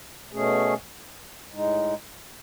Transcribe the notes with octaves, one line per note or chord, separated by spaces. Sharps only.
B2 A3 C#4 G#4
A2 G#3 D#4